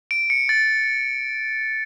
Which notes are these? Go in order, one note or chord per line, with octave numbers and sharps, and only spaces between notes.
D7
C#7
A6